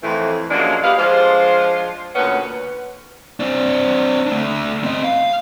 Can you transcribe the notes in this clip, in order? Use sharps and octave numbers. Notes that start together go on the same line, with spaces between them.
F2 A2 D#3 E3
F#2 F3 F#3 G#3 A#3 D4
G4 B4 D#5 F5
F3 G#3 D4 F4 C5
D2 A#2 B3 C#4 B4 F#5
C4 D4
A3 D4
C4 D#5
F5